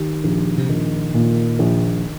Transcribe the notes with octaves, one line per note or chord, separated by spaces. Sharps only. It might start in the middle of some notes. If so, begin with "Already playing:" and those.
Already playing: D#3 G4
A#1
C3
A#1 D#3
A#2
A#1